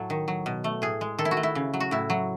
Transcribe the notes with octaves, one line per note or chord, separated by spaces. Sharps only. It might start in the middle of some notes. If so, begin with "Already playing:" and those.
Already playing: A2 F#3 A4
D#3
F#3
B2
A3
A2 G#4
G#3
D#3 A4
E4
F#4
A3
E4
C#3
F#3
F#4
A2 E4
F#3